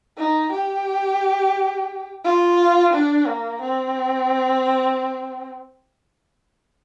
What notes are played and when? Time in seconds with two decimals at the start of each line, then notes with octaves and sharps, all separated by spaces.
0.18 D#4
0.52 G4
2.25 F4
2.93 D4
3.27 A#3
3.62 C4